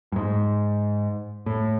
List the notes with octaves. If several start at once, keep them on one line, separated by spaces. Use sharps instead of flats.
G2
G#2
A2